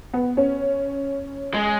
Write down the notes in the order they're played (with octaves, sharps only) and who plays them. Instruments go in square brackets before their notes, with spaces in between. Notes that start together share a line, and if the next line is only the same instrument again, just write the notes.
[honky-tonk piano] B3
C#4
[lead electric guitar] G#3